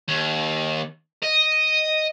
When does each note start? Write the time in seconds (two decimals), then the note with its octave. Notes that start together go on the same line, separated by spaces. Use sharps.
0.08 D#2
1.23 D#5